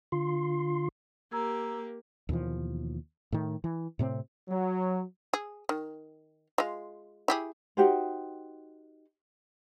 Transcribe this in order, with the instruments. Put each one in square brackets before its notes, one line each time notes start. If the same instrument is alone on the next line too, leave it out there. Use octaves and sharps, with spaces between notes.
[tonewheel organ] D3 F4 C6
[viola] A#3 G4 [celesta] A#5 E6 G#6
[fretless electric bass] D#2 B2 E3 F3
A2 D#3
E3
A2 C3 A#3 C4
[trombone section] F#3
[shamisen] G#4
D#3
G#3 F4
E4 G4 G#4
[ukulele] D#4 F#4 G4 C5